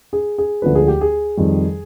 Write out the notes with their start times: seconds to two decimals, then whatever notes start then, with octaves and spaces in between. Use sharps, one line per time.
0.13 G#4
0.38 G#4
0.62 D2 D3 F3 G#3 B4
0.75 G#4
0.88 G4
1.01 G#4
1.37 F2 D#3 G3